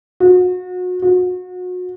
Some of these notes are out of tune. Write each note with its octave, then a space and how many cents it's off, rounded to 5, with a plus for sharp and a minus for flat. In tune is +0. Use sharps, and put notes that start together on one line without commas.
F#4 -35
F#4 -35